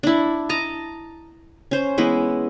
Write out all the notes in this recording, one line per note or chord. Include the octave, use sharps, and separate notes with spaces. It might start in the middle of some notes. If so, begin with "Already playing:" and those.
D4 E4
D#5 A5 A#5
C#4 C5
E3 G#3 B3 E4